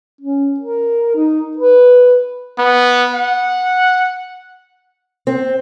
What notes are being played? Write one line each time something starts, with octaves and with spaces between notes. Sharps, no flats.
C#4
A#4
D#4
B4
B3
F#5
C4